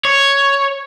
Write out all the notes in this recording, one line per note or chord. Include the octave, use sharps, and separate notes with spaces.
C#5